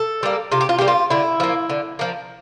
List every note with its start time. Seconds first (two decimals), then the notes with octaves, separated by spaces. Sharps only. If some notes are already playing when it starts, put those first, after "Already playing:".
Already playing: A4
0.23 G3 A#3
0.52 C3 F4
0.61 G4
0.69 F4
0.78 G3 A#3 G4
0.88 F4
1.10 D3 E4
1.40 F3 A#3
1.70 D3
1.99 F3 A#3